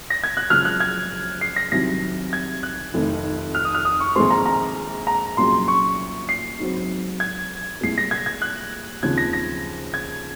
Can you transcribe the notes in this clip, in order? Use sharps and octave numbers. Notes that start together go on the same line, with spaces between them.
A#6
G#6
F#6
F#1 F#2 C#3 F3 G#3 F6
F#6
G#6
C7
A#6
C2 C3 D#3 F#3 A#6
G#6
F#6
F1 F2 D#3
F6
D#6
F6
D#6
C#6
A#1 G#2 D#3 G#3 C4 C6
A#5
A#5
A#5
C2 A#2 F#3 C#4 G#4 C6
C#6
C7
G#2 F#3 C4
G#6
C2 A#2 G#3 C7
A#6
G#6
G#6
F#6
D#2 C#3 F3 C4 G#6
A#6
A#6
G#6